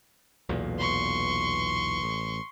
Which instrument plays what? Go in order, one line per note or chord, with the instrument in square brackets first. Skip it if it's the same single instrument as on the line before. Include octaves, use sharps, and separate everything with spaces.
[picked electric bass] B1 E2 A#2
[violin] C6 C#6
[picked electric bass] A1